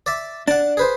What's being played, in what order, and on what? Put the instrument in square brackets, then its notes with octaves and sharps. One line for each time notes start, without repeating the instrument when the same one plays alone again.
[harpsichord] D5 E5
[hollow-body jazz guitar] D4 [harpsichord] F#5 A5
[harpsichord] G#4 B4 C5